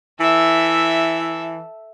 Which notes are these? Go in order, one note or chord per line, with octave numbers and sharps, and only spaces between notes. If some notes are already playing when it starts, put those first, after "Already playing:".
E3 A4 E5